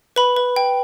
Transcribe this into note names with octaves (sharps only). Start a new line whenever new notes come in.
B4 B5
B4
G5